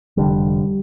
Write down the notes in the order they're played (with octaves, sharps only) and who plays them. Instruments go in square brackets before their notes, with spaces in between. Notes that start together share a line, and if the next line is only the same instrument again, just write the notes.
[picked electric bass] F1 F2 D3 G3